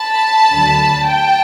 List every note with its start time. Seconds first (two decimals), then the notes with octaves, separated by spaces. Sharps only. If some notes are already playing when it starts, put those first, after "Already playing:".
Already playing: A5 B5
0.51 D2 D3 F#3
1.08 G5 A5